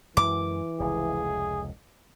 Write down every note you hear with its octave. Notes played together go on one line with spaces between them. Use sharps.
F#2 E3 G#3 D6
F1 C#2 G#4